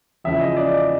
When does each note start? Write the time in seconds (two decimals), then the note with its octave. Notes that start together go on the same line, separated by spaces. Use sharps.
0.24 E2 C#3 F3 E5
0.41 D#5
0.57 D5